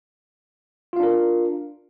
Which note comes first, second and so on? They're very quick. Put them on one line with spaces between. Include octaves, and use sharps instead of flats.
F4 F5 D4 A#4